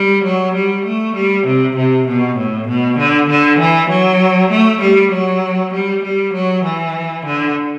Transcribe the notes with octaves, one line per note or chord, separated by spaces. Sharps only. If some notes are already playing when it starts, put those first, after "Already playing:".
Already playing: G3
F#3
G3
A3
G3
C3
C3
B2
A2
B2
D3
D3
E3
F#3
A3
G3
F#3
G3
G3
F#3
E3
D3